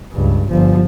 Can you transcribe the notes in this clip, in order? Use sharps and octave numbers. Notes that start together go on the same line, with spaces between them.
C#2 G2
G1 F3